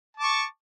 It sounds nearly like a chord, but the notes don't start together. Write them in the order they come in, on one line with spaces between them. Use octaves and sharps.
A5 D6 C#6